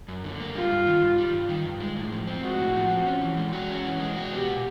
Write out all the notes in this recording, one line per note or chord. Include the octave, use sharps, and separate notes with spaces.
F#2
D3
A#3
G3 F4
G2
D#3
G2
G3
G2
D#3
G2
G#3
A2
F3
C4
G#3 F#4
A2
F3
C4
C#4
E3
G#3
F#4
C#4
E3
G#3
F#4
B3 G4
A#2